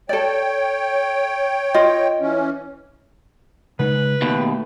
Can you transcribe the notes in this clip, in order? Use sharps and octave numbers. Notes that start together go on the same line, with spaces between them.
A4 C#5 D5 G5
F4 D#5
E3 C#4
C#3 G#3 D#4 B4
D#2 B2 A3